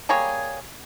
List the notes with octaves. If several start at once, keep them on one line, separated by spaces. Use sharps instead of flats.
G3 A#3 G#4 C#5